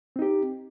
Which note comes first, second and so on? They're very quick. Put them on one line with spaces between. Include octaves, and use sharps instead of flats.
C4 D#4 G4